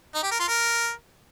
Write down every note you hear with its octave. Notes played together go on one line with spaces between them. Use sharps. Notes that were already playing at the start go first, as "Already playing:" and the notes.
D#4
G4
A#4
F4
A#4